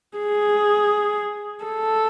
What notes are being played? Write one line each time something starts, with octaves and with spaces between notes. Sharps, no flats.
G#4
A4